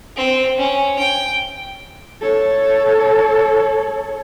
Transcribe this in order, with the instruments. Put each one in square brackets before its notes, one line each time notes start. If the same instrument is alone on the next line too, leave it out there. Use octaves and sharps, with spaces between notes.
[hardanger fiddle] C4
C#4
G5
[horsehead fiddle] A4 C#5